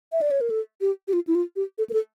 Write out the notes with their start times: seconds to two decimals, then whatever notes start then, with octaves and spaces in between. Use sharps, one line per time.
0.12 E5
0.21 D5
0.31 C#5
0.41 A#4
0.50 A4
0.81 G4
1.08 G4
1.13 F4
1.27 E4
1.35 F4
1.56 G4
1.78 A4
1.90 A#4
1.93 A4